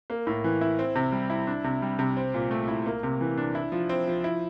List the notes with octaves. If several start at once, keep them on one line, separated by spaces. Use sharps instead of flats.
A#3
A2
E3
E4
C4
C3
G3
E4
D4
C3
G3
C3
C4
A#2
A3
E4
A#3
C3
E3
D4
E4
F3
C4
F3
E4